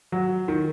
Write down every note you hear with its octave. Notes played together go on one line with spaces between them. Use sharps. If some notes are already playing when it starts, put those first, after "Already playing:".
F#3
D#3